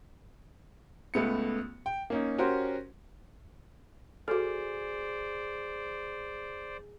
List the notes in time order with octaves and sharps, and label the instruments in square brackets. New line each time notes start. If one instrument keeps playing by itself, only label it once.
[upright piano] C#2 A3 B3 C#7
G5
A#3 C#4 D#4
C#4 F#4 G4 A#4 C5 C6
[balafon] F#4 A4 [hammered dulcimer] G#4 [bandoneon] C5 D5